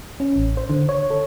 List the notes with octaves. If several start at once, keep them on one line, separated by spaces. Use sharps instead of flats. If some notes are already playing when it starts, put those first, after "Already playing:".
C#4
A1
C5
D3
C#5
A4